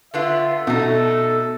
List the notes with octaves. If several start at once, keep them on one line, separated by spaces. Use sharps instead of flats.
D3 B3 F4 E5
B2 A3 D#4 A4